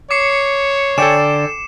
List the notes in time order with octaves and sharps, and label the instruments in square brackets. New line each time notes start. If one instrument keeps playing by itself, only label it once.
[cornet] C#5 [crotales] D6 C7 C#7
[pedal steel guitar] D3 D5 [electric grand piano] A4 G5 G#5 [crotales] E7